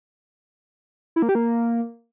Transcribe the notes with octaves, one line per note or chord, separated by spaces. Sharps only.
E4
A#3
G4
A#3